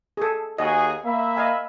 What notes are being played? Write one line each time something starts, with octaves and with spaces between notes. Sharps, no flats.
G#4 A4
D#2 F#4 G#4 D#5
A#3 E5 B5
D#5 F5 G#5